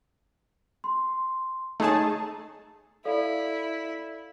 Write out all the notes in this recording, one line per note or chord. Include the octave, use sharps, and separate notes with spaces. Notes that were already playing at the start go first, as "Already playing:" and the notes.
C6
A3 D#4 G#4 C#5 A5
E4 A4 D5 F5